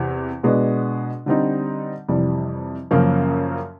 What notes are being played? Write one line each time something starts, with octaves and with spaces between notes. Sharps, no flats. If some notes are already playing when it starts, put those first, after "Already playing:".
Already playing: E2 C3 E3
B2 G#3 B3 D4
D3 G3 C4 D#4
F2 C3 E3 G3
F#2 C#3 F3 A#3 C#4